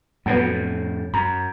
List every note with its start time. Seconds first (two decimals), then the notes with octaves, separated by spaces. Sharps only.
0.26 F2 A2 F#3 B3
1.14 F#2 A#5